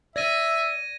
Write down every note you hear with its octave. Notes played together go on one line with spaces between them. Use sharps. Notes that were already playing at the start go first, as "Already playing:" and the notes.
D5 E5 G#6 A#6 D#7